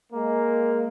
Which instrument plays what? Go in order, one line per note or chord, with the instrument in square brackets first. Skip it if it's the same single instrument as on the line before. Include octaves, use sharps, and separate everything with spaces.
[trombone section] G#3 A#3